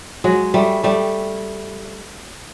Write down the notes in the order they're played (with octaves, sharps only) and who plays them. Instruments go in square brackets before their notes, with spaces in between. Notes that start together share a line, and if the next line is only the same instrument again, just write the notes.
[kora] F#3 G#3
G3 A3
G3 A3